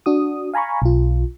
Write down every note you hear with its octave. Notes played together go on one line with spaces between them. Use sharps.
D4 F#4 D#6
F5 G#5 A#5 B5 C#6
B1 F4